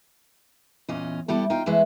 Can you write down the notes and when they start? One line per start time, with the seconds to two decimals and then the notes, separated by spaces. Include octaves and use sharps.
0.88 E2 A#2 C#4 D#5
1.28 G3 B3 E4 G4 A4
1.50 D#4 F4 G5
1.66 E3 G#3 A3 E4 B4